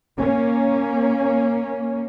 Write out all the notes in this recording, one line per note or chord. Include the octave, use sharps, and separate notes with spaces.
A#3 C#4